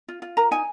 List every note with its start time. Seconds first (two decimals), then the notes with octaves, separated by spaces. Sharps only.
0.08 F4
0.22 F4
0.37 A#4 A#5
0.51 D#4 G#5